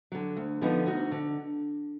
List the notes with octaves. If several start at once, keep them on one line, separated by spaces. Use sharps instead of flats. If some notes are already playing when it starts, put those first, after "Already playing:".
D3 F#3
D2
D3 F3 B3 D#4
D2 D#4 F#4
D3